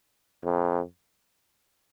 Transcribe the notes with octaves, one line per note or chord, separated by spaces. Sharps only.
F2